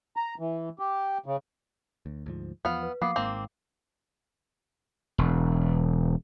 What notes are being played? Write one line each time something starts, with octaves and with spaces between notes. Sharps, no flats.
A#5
E3
G4
C#3
D2
D2 G#2 F3
E2 F3 B3 F5
B4
F3 A#3 B3 F5 D6 C7
G#1 G#2 A#3 C4
E1